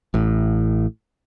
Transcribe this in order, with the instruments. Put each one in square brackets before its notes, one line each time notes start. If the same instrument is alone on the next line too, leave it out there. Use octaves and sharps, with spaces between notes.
[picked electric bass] A1 A2